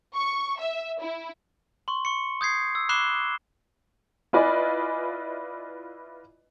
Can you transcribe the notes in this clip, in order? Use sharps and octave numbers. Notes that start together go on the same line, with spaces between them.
C#6
E5
E4
C6 C#6
C#6 C#7
D#6 G6 G#6 C7
E6
B5 D6 F#6 C7 E7 G7
E4 F4 B4 D5 D#5 G#5